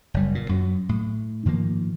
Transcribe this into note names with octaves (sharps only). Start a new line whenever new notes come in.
F#1 G3
A#2
F#2 F#3
A2
G#2 D#3 F3 A#3